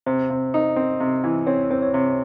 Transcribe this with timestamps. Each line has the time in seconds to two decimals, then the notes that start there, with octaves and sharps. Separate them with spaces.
0.06 C3 C5
0.30 C3
0.54 D#4
0.76 C4
1.00 C3
1.24 E3
1.47 C4 C#5
1.71 C4 C5
1.82 C#5
1.94 C3